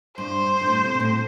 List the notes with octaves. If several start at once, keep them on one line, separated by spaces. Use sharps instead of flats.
G2 C5
G2
A2
C3
C3
A2